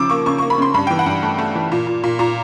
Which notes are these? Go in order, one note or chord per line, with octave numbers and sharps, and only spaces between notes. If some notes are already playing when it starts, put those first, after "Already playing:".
Already playing: C#3 F3 D6 E6
A#3 C#6
C#3 C#6
C#6
A#3
B5
C#3 C6
G2 B5
G5
E3
F#5
G2
A3
A3
E3
A#2
A#2
A#2
A#2 A#5